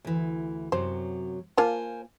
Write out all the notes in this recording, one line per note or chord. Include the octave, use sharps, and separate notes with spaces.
D2 E3
F#2 C3 F#3 C5
A#3 F4 A#4 C5 G#5 A5